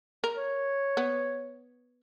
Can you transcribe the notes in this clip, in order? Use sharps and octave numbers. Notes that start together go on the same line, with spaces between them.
A#4
C#5
B3